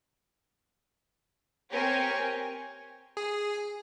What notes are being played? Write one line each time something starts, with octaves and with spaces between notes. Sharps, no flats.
C4 G4 A#4 C#5 G#5
G#4